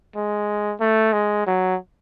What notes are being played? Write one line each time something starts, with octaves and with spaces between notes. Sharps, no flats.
G#3
A3
G#3
F#3